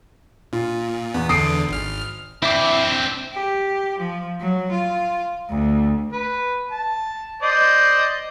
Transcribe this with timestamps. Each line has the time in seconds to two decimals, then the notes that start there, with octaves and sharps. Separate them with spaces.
0.53 A#2 F4
1.14 E2 B3
1.29 E2 D3 D#6 C7 D7
1.69 G#1 F6
2.43 C4 D4 E4 E5 D6
3.33 G4
3.99 F3
4.40 F#3
4.72 F4
5.50 D2
6.12 B4
6.70 A5
7.42 C5 D5 D#5